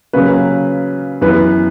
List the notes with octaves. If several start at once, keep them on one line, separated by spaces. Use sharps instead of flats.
C#3 F#3 A#3 C#4 B4
F#2 E3 B3 B4